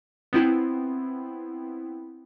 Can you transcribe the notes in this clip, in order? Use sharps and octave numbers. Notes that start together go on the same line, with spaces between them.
B3 C4 E4